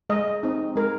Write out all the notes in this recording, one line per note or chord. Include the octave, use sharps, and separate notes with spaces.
G#3 D#5
C4 D#4
G#3 A#4